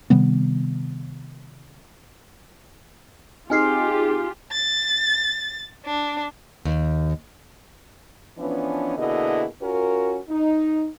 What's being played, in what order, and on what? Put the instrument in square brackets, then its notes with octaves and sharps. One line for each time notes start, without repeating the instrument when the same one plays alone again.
[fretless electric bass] C3 D#3 G3 B3
[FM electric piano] C4 D#4 G#4 [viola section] F4 G4 [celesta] G#5 F6 C7
[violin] A6
D4
[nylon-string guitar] D#2
[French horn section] E3 F3 B3 C#4 D4
B2 D3 A#3 E4 G#4 D#5
C#4 F4 F#4 A#4
D#4